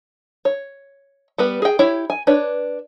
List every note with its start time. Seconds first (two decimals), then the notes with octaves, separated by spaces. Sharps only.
0.45 C#5
1.38 G3 B3 B4
1.62 G#4 G5
1.79 E4 G4 C#5
2.10 G#5
2.27 D4 B4 C#5